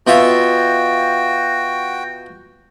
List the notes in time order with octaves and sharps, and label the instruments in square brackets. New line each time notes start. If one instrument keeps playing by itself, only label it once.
[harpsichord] B2 F4 E5 [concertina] F#4 G5